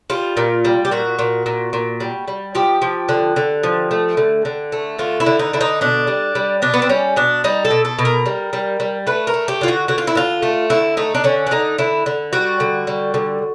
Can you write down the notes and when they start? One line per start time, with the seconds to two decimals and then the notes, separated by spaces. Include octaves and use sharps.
0.10 G3 F4
0.37 A#2
0.65 G3
0.85 G4
0.91 A#2 F#4
1.19 A#2
1.46 A#2
1.73 A#2
2.00 G3
2.28 G3
2.55 F3 G4
2.82 F3
3.09 D3
3.36 D3
3.63 F3
3.91 A3
4.17 D3
4.45 D3
4.72 A3
4.99 D3 F4
5.20 E4
5.26 D3
5.39 D#4
5.53 D3 E4
5.61 D#4
5.81 B2 D4
6.07 G3
6.35 G3
6.62 B2 D4
6.74 B3
6.82 C4
6.89 G3 C#4
7.16 B2 D4
7.44 G3 D#4
7.65 A4
7.71 B2
7.85 A4
7.99 B2
8.05 A#4
8.26 G3
8.53 G3
8.80 G3
9.07 A3 B4
9.27 A#4
9.34 A3
9.48 G4
9.61 D3 F4
9.68 F#4
9.88 D3 F#4
9.98 F4
10.07 E4
10.15 D3 F4
10.42 A3
10.70 D3 E4
10.97 A3 D#4
11.15 D4
11.24 D3 C#4
11.47 D4
11.51 D3 D#4
11.78 D3 E4
12.06 D3
12.33 G3 F#4
12.60 D3
12.87 G3
13.14 D3